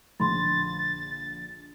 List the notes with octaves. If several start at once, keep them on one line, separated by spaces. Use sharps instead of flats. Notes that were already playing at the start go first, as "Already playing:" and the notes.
A#1 D3 B5 C6 A6